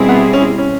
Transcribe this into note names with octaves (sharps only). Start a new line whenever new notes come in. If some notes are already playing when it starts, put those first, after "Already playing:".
Already playing: B2 G3 C4 E4 G#4
B3
C#4
C#4